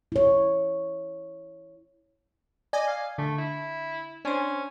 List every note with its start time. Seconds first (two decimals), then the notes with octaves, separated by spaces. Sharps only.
0.12 E4 C#5
2.73 D5 D#5 G#5
2.87 F5
3.18 D3 A3
3.38 E4
4.25 C#4 D4 C5